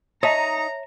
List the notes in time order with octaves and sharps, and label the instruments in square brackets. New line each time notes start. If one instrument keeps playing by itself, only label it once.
[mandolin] D#4 [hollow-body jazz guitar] C#5 E5 A5 [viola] A#5